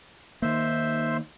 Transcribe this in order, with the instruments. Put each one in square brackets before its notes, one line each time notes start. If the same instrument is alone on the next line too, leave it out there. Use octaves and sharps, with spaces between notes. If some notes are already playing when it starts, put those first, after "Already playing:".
[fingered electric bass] D#3 A#3 [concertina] C5 E5 C6